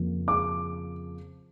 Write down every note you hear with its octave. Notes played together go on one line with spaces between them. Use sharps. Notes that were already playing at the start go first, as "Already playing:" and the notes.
Already playing: F2 C#3 F3 A#3
D6